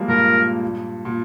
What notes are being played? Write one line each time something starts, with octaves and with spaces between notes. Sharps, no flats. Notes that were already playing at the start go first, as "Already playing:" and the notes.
Already playing: F3 G3 G#3 A#3
G2 A#2 A#4
A#2